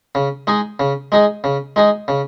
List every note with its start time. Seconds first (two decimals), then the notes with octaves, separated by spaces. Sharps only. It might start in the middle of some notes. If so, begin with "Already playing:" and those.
0.15 C#3
0.47 G#3 D#4 G#4
0.80 C#3
1.12 G#3 D#4 G#4
1.44 C#3
1.76 G#3 D#4 G#4
2.08 C#3